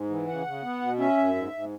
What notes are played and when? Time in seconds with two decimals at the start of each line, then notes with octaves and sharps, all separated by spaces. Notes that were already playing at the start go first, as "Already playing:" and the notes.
Already playing: G#2
0.10 E3
0.27 C#3 F#5
0.46 C#3
0.63 B3
0.81 B2
0.99 C#4 E5
1.17 F#2
1.35 G#2
1.53 G#2